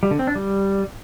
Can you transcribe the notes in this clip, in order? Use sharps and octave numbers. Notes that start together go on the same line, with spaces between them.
G3
D3
C4
D4
G3